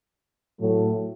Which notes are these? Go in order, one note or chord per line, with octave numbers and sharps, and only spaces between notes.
A2 F#3 A3